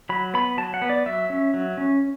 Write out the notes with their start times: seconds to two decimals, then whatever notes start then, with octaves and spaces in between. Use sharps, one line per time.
0.09 F#3 B5
0.34 B3 B5
0.58 F#3 A5
0.74 F#5
0.82 B3
0.90 D5
1.06 F#3 E5
1.30 C#4
1.54 F#3
1.77 C#4